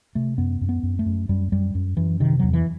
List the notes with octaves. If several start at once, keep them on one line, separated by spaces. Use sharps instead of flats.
C3 A3
F#2 B3
F#2
B3
F#2
A3
F#2
F#2 G3
F#2 G3
F#2
F#2 E3
C3 D#3
E2 F#3
E3